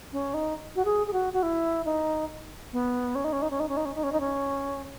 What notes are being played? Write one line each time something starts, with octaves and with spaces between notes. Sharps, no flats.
C#4
D#4
F#4
G#4
G#4
F#4
F#4
E4
D#4
B3
C#4
D#4
C#4
D#4
C#4
D#4
C#4
D#4
C#4
D#4
C#4
D#4
C#4